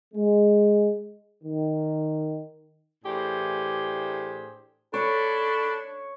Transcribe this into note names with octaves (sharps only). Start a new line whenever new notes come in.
G#3
D#3
A2 E3 D4 G4 G#4 C5
D4 A4 C#5 B5